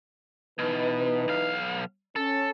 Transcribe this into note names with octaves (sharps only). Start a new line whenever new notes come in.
B2 E3 D#4 B4
B1 F5
C#4 A4